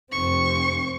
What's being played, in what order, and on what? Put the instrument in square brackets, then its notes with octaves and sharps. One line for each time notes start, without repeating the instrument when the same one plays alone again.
[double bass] F1 C4 [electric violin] C#6